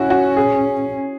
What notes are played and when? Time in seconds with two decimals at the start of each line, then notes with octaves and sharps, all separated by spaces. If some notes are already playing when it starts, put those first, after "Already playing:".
Already playing: C#4 E4 F#4
0.10 F#4
0.36 G#4